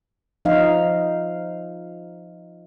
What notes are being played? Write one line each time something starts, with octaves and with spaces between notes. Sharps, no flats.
F3 D#4 F5